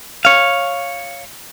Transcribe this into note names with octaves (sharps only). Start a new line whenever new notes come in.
C#5 F5